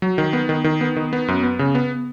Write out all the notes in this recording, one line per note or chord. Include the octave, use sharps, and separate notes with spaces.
F#3
D#3
B3
D#3
D#3
B3
D#3
B3
F#2
B3
C#3
B3